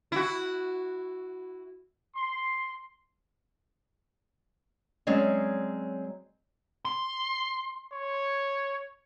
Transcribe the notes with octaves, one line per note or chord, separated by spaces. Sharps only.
E4 F#4
C6
F#3 G#3 C4 C#4 C#5 D5
C6
C#5